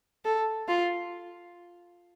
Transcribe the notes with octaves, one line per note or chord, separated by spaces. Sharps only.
A4
F4